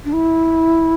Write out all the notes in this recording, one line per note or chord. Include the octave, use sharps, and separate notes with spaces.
D4
E4